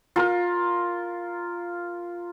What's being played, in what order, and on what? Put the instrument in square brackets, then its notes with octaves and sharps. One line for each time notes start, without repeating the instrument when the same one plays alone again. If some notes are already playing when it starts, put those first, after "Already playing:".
[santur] F4 A#4